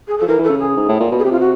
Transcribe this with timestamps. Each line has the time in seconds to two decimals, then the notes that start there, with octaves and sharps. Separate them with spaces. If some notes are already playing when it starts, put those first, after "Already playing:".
0.08 G#4
0.18 F3 A4
0.28 E3 A#4
0.39 E3
0.44 C#3 A4
0.60 G#4
0.77 G#2
0.88 A2
1.00 A#2
1.12 B2
1.19 G#4
1.24 C3 G4
1.32 F4
1.40 F#4